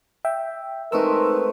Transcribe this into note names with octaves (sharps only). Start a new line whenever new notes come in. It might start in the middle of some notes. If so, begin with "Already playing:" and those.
E5 G5
G#3 A3 C4 D#4 A#4 B4 E6